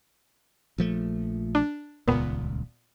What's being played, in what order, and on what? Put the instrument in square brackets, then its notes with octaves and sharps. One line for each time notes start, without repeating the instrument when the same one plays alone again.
[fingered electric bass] A#1 F3 A3
[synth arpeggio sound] D4
[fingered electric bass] D#1 C#2 [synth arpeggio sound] A#2 B3